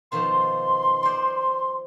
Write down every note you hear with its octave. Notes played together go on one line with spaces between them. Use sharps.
B2 D#3 F3 C6
C5 D5